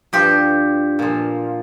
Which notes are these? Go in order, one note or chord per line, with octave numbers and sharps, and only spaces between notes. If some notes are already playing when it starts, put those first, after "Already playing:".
G2 F3 G4
A#2 F3